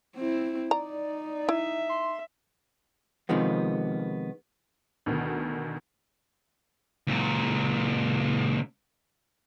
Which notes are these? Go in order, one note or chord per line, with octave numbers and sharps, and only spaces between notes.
C4 E4
D#4 D5 A#5
E4 E5
C6
C3 D#3 F3 G#3 B3
D2 B2 D#3
C#2 A#2